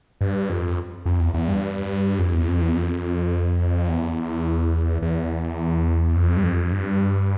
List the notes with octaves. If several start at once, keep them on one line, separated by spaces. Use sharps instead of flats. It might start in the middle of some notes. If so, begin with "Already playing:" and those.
G2
F2
F2
E2
E2
G2
F2
E2
F2
E2
F2
E2
E2
F2
G2
F2
G2